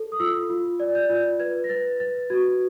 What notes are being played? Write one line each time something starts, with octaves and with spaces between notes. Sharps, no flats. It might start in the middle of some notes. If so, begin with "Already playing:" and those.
Already playing: A4
D#6
F4 E6
F4
D5
G6
F4
B4 G#6
A#6
B4 A6
B4 A6
F#4 G#6